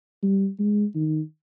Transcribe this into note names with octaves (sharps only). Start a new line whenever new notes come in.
G3
G#3
D#3